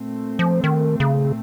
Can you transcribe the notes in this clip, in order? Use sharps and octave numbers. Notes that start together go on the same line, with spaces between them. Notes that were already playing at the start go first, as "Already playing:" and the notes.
Already playing: A#2 A3 C4
F3
D#3
C#3